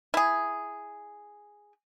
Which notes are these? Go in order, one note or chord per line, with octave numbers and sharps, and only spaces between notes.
E4 G#4